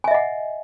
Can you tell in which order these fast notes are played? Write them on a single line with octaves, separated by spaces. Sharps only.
G#5 E5 D#5 F#5